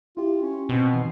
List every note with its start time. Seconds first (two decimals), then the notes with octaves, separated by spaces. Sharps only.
0.17 E4 F4 G4
0.42 C#4
0.69 B2 C4
0.93 D#3 E3 C7